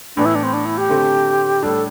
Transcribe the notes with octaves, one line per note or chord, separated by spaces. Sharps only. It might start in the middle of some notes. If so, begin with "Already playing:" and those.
A2 E3 B3 D4
E4
D4
C4
D4
E4
G4
D3 A3 C4
A2 G3 D4 A4